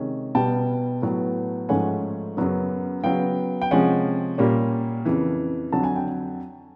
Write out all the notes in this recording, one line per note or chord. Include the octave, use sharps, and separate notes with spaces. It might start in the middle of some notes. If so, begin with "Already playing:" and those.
Already playing: C3 D#3 G#3 C#4
B2 G3 B3 G5 A5
A2 F#3 B3
G#2 F3 A3 C#4 F#5 G#5
F#2 C#3 F#3 B3
C#3 F#3 B3 F5 G5
G5
C3 F3 G#3 C#4 F#5 G#5
A#2 G3 A#3 C#4
F2 C#3 E3
F2 D3 F#3 A5
G#5
G5